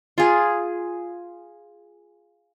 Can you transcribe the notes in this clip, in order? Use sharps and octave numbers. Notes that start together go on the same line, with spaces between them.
F4 G#4